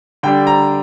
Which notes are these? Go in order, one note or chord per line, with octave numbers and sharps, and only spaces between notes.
D3 G3 D4 G5
A#5